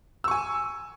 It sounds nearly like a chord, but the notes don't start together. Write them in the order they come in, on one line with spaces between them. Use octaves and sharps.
E6 C#6 G#5